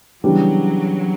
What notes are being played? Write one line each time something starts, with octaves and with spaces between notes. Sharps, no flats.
C#3 E3 F#3 G3 B3 D4